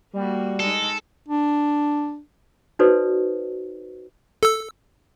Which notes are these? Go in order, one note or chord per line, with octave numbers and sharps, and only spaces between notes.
G3 A#3 F#4
G#3 D#4 A4
D4
D#4 F#4 A4 B4 C5 D5
A4 E6